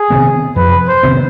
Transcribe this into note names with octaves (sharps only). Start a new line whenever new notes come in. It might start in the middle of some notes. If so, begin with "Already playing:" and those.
Already playing: G#4
C3 D#3 B3
F2 B4
C5
C3 D#3 B3